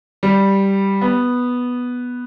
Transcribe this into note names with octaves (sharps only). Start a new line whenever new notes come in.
G3
B3